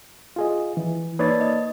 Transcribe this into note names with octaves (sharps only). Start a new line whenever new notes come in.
F4 G#4 D#5
E3
A#3 D#4 B4 C#5 D5 A6
D#5